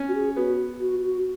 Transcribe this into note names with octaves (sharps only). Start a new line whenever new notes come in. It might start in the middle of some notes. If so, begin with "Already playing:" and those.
Already playing: C#4
F#4
G#4
B3 F#4
F#4
F#4